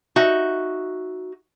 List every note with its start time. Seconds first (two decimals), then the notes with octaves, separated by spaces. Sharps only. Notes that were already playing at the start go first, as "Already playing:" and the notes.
0.16 D#4 F#4 E5